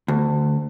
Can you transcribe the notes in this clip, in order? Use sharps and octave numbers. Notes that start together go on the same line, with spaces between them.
D2